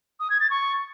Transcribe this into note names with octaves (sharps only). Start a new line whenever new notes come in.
D#6
G#6
A6
C#6